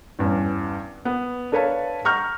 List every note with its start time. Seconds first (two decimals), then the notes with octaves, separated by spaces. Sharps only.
0.19 E2 G2 C#4
1.05 B3
1.52 D4 A4 B4 C#5 F5 A5
2.05 F#5 A#5 C#6 F6 G6